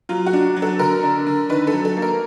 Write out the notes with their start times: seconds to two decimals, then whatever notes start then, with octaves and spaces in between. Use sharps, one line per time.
0.09 F#3 F4
0.26 F#4
0.33 D4
0.56 F#3
0.62 A4
0.79 D3 A#4
1.03 D4
1.27 D3
1.49 D#3 B4
1.67 A4
1.73 F#3
1.85 A4
1.97 A#3
2.02 A#4